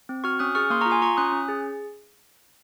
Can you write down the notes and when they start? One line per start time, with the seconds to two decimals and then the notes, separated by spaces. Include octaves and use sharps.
0.09 C4
0.24 F#4 C#6 F6
0.39 C#4 D#6 F#6
0.55 G#4 C#6 F6
0.70 A#3 C6 D#6
0.81 F4 A#5 C#6
0.91 G#5 C6
1.02 F4 A#5 C#6
1.17 C#4 D#6 F#6
1.32 C#4
1.49 G#4